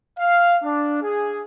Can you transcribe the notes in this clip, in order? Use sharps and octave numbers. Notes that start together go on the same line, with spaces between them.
F5
D4
G#4